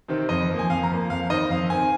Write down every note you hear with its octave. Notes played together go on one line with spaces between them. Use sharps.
C3 D#3 C4
F2 D#5
F3 A#3
G#5
F2 F5
A#5
F3 A#3
F2 F5
D#3 C4 D#5
F2 F5
D#3 C4 G#5